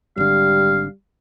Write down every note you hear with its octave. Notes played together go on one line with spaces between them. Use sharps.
G#1 D3 G3 F5